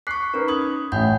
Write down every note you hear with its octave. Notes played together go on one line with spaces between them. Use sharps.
C#6 D6 F#6 B6 C7
C#4 D#4 A#4 B4
B5 D#6 G#6 F#7
A1 A2 F#5 B5 G6